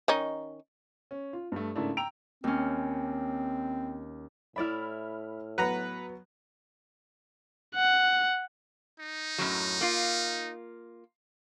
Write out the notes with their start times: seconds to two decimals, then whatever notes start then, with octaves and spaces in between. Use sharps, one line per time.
0.08 D#3 C#4 D#4
1.11 C#4
1.33 F4
1.52 G2 A3
1.75 G#2 C#3 A3 A#3 D4 E4
1.97 G5 A#5 E6 D7 F7
2.44 D#2 C4 C#4
4.56 A2 E4 D5 E5 B5 F6
5.58 F#3 B3 B4 F#5 A#5
7.75 F#5
8.99 D#4
9.38 F#2 A2 F#3
9.81 A#3 F4